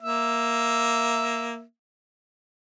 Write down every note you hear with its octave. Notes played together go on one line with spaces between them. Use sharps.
A#3 E5